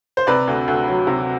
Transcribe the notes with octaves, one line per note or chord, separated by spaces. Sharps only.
C5
C3 B4 D5
D2
D2
F#3
C3